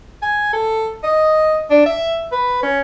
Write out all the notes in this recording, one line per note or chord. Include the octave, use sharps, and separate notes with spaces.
G#5
A4
D#5
D4
E5
B4
C#4